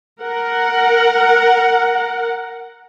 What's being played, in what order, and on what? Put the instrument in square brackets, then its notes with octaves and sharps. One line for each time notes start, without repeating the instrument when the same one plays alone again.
[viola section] A#4 F#5